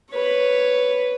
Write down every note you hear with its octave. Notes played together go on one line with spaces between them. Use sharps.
B4 C#5